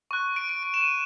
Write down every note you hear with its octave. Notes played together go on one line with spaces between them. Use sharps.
C#6 F#6
D7
D7
D7
E7
D#7